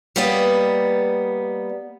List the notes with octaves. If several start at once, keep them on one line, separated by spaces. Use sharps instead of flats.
G3 A#3 B3 B4 D5 D#5